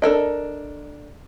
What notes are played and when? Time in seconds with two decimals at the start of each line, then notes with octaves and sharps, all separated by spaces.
0.02 D4 A4 A#4 D#5